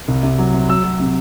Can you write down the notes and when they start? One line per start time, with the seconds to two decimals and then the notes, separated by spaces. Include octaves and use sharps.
0.08 C2
0.23 C3
0.38 F#3
0.54 C3
0.69 F#3 E6
0.84 F#3
1.00 C3